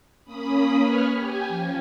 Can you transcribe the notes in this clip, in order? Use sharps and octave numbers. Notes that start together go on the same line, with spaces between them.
A#3 C#4 B5 D#6
B4 C#5 C#6 F6
G4 G#5
F3 C#4